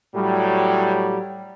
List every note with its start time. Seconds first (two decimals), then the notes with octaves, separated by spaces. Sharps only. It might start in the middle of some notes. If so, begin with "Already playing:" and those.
0.15 A2 F#3 G3